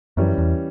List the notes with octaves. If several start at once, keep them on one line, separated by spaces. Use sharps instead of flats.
F#2 E3 G3 C#4
E2